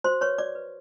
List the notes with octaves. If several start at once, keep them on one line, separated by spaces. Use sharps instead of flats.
F#4 C5 C6
B4 C#5 C#6
F#4 D5 D6
B4